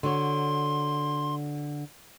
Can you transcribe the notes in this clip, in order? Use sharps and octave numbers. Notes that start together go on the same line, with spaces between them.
D3 F#4 C#5 C6